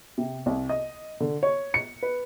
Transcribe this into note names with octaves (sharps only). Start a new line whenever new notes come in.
C3
C2
D#5
D3
C#5
C#7
B4